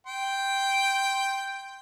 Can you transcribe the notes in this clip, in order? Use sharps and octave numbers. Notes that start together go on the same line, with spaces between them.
G5 C6